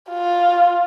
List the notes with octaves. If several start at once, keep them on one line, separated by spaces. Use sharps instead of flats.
F4